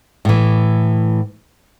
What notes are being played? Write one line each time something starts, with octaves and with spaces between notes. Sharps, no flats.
A2 E3